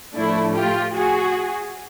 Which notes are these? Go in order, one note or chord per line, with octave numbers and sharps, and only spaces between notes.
A2 F3 A3 D4 E4
F4 G4
F#4 G#4